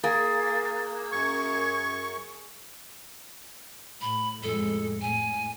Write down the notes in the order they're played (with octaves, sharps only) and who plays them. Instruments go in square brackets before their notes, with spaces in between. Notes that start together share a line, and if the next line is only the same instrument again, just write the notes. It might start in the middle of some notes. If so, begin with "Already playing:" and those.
[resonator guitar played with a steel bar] A#3 [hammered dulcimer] G#4 [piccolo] A6
[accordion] F#2 C#6 [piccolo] G#6
[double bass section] A2 [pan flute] B5
[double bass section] F2 A2 G#3 [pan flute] A4
[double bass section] A2 [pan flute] G#5